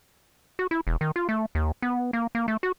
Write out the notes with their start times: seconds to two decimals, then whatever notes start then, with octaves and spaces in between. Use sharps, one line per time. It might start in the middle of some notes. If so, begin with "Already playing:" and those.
0.59 F#4
0.71 E4
0.87 E1
1.01 D#3
1.16 F4
1.29 A3
1.55 D#2
1.82 B3
2.13 A#3
2.35 A#3
2.48 A3
2.63 F#4